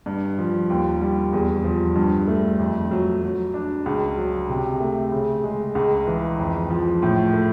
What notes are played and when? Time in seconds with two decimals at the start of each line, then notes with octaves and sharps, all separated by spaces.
0.06 G2
0.38 F3
0.70 D#2
1.01 G3
1.33 E2
1.64 F3
1.96 G2
2.28 A3
2.59 F2
2.91 F#3
3.22 F#3
3.54 D4
3.86 C#2
4.17 F#3
4.49 C3
4.80 A3
5.12 C#3
5.44 G#3
5.75 C#2
6.07 E3
6.39 F2
6.70 F3
7.02 A2
7.33 A3